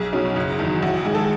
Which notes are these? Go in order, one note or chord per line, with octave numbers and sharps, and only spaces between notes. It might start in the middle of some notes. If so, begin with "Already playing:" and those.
Already playing: B1 G#4
B2 F#3 C#4
F#1
E2 D#3 F#3
A1 F#4
G#2 D#3 G#4
A4